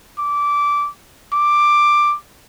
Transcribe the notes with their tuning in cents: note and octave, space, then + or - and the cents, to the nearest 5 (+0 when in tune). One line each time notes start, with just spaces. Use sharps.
D6 -15
D6 +10